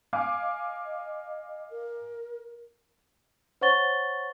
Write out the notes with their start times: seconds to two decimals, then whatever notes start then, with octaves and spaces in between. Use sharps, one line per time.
0.13 F5 G#5 D6
0.42 D#5
1.71 A#4
3.61 C5 C#5 F#5 C#6 A6 G7